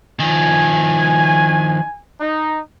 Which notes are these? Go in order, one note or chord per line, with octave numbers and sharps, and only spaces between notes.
D#3 F3 G#5
D#4